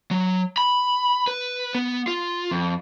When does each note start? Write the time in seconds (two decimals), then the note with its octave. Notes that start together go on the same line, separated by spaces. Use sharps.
0.11 F#3
0.57 B5
1.27 B4
1.75 B3
2.07 F4
2.51 F2